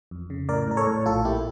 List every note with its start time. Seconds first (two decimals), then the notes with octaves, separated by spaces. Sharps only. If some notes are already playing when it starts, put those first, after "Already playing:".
0.11 F2
0.30 C#3
0.49 A2 A#4 D5
0.67 A2 A#4
0.77 A4 C#5
0.87 A2
1.06 A#1 F4 A4
1.25 A#3 E4 G4